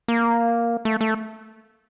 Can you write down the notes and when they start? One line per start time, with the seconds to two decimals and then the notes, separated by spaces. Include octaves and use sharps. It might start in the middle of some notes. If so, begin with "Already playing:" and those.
0.08 A#3
0.85 A3
1.01 A3